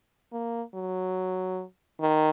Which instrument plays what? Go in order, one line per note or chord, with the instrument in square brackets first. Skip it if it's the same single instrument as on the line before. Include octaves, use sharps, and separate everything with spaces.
[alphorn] A#3
F#3
D#3